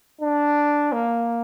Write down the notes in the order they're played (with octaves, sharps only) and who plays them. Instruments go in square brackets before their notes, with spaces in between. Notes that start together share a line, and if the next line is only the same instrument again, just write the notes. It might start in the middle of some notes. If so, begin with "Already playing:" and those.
[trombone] D4
A#3